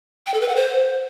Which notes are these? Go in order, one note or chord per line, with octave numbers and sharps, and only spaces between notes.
G5
A4
B4
F#5
C5